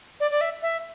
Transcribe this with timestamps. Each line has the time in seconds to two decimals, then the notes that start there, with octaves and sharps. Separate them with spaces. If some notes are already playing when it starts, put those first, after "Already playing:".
0.20 D5
0.31 D5
0.41 E5
0.62 E5